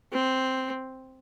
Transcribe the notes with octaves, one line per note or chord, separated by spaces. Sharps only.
C4